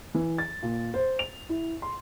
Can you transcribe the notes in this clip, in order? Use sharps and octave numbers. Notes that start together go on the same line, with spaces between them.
E3
A6
A#2
C5
F7
E4
C6